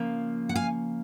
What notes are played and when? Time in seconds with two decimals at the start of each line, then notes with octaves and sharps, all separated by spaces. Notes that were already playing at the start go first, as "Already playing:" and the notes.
Already playing: C#3 F3 A#3
0.49 F#5
0.55 F5 G#5